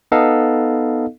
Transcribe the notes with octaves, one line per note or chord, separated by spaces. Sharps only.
B3 D#4 A4 D#5 F5